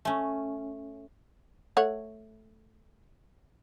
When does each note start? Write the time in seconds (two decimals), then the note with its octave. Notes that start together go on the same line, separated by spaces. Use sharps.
0.05 A3 C#4
1.77 A3 C#5 F#5